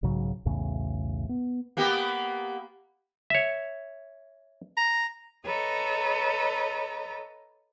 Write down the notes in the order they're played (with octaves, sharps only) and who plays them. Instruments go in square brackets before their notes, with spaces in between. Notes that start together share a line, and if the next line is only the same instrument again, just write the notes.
[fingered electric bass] B1 G#2 C#3 F#3
B1 E2 A2 C#3
B3
[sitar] A#3 B3 G4
[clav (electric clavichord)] C#5 E5
[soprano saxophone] A#5
[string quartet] A4 B4 C#5 D#5 A#5